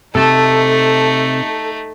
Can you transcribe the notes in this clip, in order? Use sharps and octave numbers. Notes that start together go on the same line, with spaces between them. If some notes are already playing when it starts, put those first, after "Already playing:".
C3 A3 D#4 A4 A5